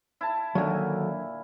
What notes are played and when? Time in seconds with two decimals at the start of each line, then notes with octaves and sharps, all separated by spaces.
0.21 E4 A5
0.55 A#2 D3 D#3 F#3